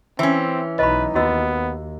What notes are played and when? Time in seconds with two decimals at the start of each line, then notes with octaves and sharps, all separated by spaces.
0.19 E3 C4 C#4 E5
0.79 B1 D#4 B4 D#5 B5
1.15 D#2 B3 F#4 D#5 E6